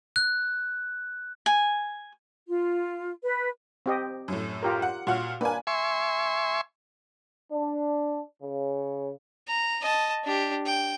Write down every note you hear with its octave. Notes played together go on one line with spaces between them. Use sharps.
F#6
G#5
F4
B4
C4 G4 D#5
F#2 A2
F4 G4 A#4
F#5
A#2 F#4 F#5 F6
A#3 D4 B4 G#5
E5 G#5 C6 C#6
D4
C#3
A#5
D#5 A5
D4 G4
G5